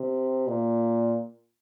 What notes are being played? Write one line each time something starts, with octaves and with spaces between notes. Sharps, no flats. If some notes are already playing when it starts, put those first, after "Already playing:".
Already playing: C3
A#2